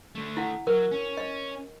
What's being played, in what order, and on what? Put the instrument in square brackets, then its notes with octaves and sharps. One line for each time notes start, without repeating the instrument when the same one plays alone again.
[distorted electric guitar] D3 A3
[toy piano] E4 F#5
[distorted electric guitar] F#3 [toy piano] A#4
[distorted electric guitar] C#4
[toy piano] D#5